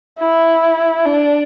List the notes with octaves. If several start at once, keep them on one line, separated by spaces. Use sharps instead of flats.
E4
D4